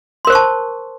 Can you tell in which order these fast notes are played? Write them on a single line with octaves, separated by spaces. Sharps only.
C6 A#4 C5 C#6 A5